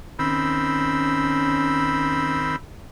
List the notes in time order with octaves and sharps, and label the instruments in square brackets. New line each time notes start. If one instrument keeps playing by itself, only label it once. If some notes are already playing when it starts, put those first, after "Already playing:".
[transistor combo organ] D#3 C4 [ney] C#4 [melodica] B5 E6